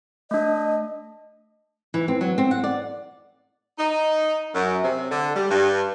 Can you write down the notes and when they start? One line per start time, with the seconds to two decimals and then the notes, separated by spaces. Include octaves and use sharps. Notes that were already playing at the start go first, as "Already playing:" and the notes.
0.31 A3 D4 D#5
1.94 E3
2.08 C4
2.21 F#3
2.38 C4
2.51 F#5
2.64 D5
3.78 D#4
4.54 F#2
4.83 C3
5.09 D3
5.34 G3
5.49 G2